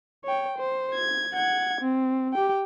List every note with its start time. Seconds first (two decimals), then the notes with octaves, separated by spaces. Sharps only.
0.25 C#5 G5
0.58 C5
0.94 G#6
1.34 F#5 G#6
1.81 C4
2.34 G4 G5